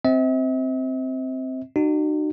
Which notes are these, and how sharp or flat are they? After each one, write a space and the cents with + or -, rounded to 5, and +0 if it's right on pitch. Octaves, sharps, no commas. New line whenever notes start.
C4 +0 E5 -45
D#4 -40 F#4 +30